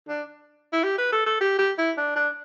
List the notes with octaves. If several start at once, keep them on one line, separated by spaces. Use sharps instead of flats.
D4
E4
G4
B4
A4
A4
G4
G4
E4
D4
D4